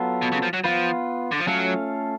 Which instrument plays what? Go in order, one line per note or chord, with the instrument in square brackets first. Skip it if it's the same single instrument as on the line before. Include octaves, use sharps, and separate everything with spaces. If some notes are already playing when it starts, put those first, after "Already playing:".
Already playing: [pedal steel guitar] F#3 B3 F4 A4
[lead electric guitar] B2
C#3
F3
F#3
[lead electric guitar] F3 [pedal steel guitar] B3 F4 B4
[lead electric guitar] D3
F3
[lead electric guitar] F#3 [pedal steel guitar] A3 C#4 F4 A4 F5